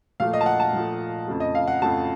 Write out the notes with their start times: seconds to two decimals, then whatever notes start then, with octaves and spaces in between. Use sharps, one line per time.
0.20 A#2 F3 A3 F5
0.33 D#5
0.41 A5
0.46 F#5
0.60 A5
0.73 A#2 F3 A3
1.28 F2 C#3 A3
1.40 D#5
1.55 F5
1.68 F#5
1.82 F2 C#3 A3 A5